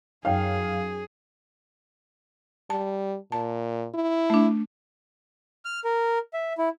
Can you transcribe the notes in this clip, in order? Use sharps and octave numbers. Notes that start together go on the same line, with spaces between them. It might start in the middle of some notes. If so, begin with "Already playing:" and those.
F#2 D#4 G#4 C#5 F5 G5
G3 A5
A#2 A5
E4
A3 D4
F6
A#4
E5
E4